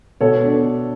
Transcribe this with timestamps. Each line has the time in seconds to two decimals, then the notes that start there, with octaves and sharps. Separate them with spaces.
0.21 B2 A4 C#5
0.43 D4